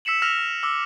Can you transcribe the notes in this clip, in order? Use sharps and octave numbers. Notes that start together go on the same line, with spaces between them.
E6 B6 C#7 E7 F#7
E6 F6 A#6 B6 F7
D6 E6